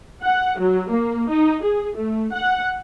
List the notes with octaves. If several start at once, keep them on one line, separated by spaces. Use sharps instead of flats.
F#5
F#3
A#3
D#4
G#4
A3
F#5